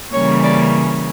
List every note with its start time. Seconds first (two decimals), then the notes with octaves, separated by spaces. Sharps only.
0.13 C#3 E3 G3 A#3 C#4 C#5
0.43 D5